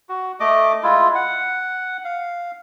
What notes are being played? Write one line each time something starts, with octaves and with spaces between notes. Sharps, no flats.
F#4
A3 D#5 D6
G#3 E4 F4
F#5
F5